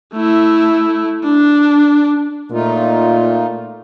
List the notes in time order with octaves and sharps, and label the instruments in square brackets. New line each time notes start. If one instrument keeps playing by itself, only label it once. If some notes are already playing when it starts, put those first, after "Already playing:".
[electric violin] A3 E4
D4
[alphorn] A#2 [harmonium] A3 D#4 F4